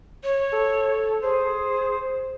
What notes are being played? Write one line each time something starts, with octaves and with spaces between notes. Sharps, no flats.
C#5
A4
G#4 C5